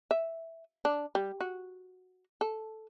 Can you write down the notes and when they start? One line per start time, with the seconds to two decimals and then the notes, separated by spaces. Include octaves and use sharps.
0.11 E5
0.85 D4
1.15 G3
1.41 F#4
2.41 A4